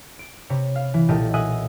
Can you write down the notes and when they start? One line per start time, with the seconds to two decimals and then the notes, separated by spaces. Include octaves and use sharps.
0.19 D7
0.50 C3 C#5 B5
0.76 F5
0.94 E3
1.08 B1 A#2 E4 G4 A4 D#5
1.34 D#5 E5 F#5 G#5 D#6 F#6